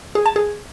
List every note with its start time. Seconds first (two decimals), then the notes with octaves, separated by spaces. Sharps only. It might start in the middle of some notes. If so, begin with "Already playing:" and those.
0.15 G#4
0.26 A5
0.36 G#4